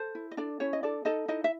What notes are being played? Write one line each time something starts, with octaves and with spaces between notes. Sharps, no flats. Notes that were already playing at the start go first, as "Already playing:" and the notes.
Already playing: A4 C5
E4
D#5
D4 A4 D5
C#4 E4 C#5
D#5
D4 A4 D5
D#4 A4 D#5
D#4 E4 D#5
E5